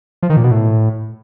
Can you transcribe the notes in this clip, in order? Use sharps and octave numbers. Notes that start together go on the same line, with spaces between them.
F3
D#3
A#2
B2
A2